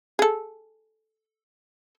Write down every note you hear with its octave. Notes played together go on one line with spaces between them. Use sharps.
G#4 A4